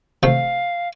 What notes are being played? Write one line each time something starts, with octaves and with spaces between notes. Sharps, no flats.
C3 A3 F5